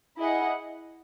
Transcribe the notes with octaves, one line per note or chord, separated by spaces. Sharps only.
E4 G#4 D#5 F#5